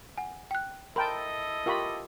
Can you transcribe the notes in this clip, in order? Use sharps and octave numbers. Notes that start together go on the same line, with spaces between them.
F#5 G#5
G5 F#6
E4 A4 A#4 D#5 G5 A5 B5 C6
F4 G4 A#4 G5 B5 C#6